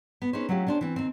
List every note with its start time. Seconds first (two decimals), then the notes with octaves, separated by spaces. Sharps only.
0.22 B3
0.33 C#4 D#4 G#4 B4 C5
0.49 F#3 A3 C#4 F4 G4
0.67 A#3 C#4 D4 G4 C5
0.81 E3 C4
0.96 D#2 C4